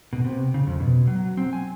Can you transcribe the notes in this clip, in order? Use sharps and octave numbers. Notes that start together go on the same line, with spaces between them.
B2
C3
C#3
F2
B2
F#3
C4
G#5